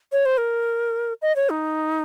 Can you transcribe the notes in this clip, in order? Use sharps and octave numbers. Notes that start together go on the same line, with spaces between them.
C#5
C5
A#4
D#5
C#5
D#4